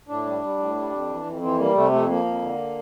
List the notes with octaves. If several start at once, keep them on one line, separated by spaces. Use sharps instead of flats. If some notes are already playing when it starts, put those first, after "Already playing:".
A2 D4
G3
G3
A2
G3
F2
E3
F2
E3 C4
G3 A#3
C3 A3
F2 A3
F3 A#3
F2
D3